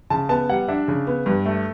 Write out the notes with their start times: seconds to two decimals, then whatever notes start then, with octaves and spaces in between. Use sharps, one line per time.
0.10 C#3 A5
0.29 B3 A5
0.49 G3 F#5
0.68 D4 E5
0.88 C#3
1.07 B3
1.26 G2
1.46 A3